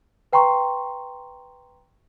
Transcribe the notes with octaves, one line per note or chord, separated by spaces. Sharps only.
B4 G5 A#5 C6 C#6